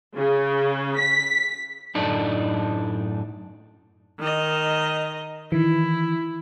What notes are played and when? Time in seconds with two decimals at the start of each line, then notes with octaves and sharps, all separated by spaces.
0.17 C#3
0.98 B6
1.95 F#2 A2 A3 D4 D#4
4.19 D#3 D#5
5.52 D#3 E3 E4